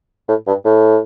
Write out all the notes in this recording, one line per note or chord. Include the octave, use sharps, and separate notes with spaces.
A2
G2
A2